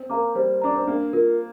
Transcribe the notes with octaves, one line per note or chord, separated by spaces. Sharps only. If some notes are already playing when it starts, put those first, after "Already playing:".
Already playing: C4
A#3 A#4 F5 A#5 D6
G3 C5
D4 A#5 D6
C4
A#3 D4
F4 A#4